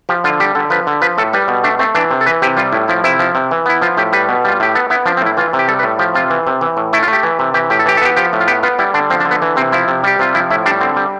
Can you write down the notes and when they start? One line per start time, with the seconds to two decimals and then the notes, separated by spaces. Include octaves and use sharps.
0.09 F3 G4
0.24 D3 F4
0.40 G3 G4
0.55 D3 A4
0.70 F3 B4
0.87 D3
1.02 F3 B4
1.18 A2 A4
1.33 G3 B4
1.48 B2
1.64 A3 D4
1.79 A3 C4
1.95 E3 D4
2.11 C3
2.21 A4
2.26 E3 B4
2.42 C3 G4
2.57 G3 F4
2.72 A2 E4
2.88 F3 E4
3.04 C3 E4
3.19 F3
3.35 C3
3.51 E3
3.66 B3 E4
3.82 F3 F4
3.97 A2 G4
4.13 G3 B4
4.29 B2
4.45 G3 F4
4.60 A2 G4
4.75 B3 A4
4.90 B3 E4
5.06 F3 D4
5.17 C4
5.21 A2
5.26 E4
5.37 E3 F4
5.53 C3
5.59 G4
5.68 G3 A4
5.79 B4
5.83 A2
5.99 F3 G4
6.15 C3 F4
6.30 E3
6.47 C3
6.61 E3
6.77 A2
6.93 A3 E4
7.03 F4
7.08 A3
7.13 G4
7.23 E3
7.39 C3
7.54 E3 G4
7.70 A2 G4
7.79 A4
7.86 E3 G4
7.97 A4
8.02 B3 G4
8.16 F3 G4
8.33 A2
8.40 F4
8.48 B3 G4
8.63 B3 F4
8.79 G3 E4
8.94 D3 D4
9.10 F3 C4
9.20 D4
9.25 D3
9.31 B3
9.42 E3
9.56 C3 C4
9.72 F3 E4
9.88 C3
10.04 G3 G4
10.19 C3 F4
10.34 F3 E4
10.50 A2 E4
10.66 G3 D4
10.81 D3 C4
10.96 G3